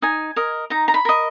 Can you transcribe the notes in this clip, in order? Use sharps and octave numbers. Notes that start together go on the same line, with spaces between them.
D#4 G#5
A#4 D#5
D#4 A#5
A#5
B5
A#4 D#5